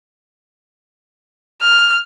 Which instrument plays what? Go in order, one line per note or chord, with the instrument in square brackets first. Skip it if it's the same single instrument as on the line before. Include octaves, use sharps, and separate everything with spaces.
[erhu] F6